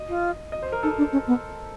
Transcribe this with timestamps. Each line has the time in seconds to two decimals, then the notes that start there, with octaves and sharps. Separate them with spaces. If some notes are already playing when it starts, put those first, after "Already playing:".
Already playing: D#5
0.08 F4
0.52 D#5
0.62 C5
0.72 A#4
0.83 D#4 A4
0.97 D4
1.12 C#4
1.27 B3